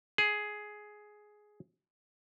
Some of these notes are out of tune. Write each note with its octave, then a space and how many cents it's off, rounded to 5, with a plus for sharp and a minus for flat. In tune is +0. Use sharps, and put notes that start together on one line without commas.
G#4 +10